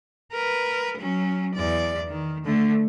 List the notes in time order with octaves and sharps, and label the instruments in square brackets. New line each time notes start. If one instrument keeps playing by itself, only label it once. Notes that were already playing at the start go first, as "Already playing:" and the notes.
[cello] A#4 B4
F#3 C#4
E2 D5
D#3
D3 A3